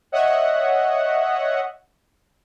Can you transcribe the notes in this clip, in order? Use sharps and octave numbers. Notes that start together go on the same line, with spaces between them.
C#5 D#5 E5 F#5